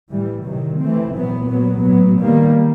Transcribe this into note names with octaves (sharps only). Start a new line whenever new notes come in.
A2 E3 G3
C3 D#3 F#3
E3 A3 C4
A#2 F#3 B3
A#2 F#3 B3
A2 F#3 B3
D#3 G3 A#3